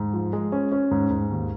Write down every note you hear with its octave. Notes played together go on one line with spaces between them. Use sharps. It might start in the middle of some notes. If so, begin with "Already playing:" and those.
Already playing: G#2
F3
G#3
C#4
C#4
G#2
G#2
D#2